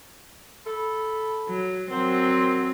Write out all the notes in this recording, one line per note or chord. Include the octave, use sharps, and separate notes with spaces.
A4 B5
F#3
F#3 C4 A#4 C5 F#5